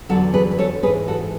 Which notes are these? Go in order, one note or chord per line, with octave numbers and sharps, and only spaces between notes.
E2 D3 F#3 F#4 A4
G#4 B4
B4
A4 C#5
G#2 E3 G#3 G#4 B4
F#4 A4